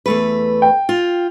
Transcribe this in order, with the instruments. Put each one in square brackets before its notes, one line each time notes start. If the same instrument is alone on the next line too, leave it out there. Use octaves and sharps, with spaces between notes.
[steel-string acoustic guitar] E2 A3 B4
[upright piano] G5
[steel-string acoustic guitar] F4